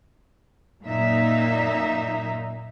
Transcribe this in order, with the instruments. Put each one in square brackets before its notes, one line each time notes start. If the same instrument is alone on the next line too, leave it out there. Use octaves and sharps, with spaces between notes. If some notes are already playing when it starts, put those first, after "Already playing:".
[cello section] F#2 A#2 A#3 D#4 E5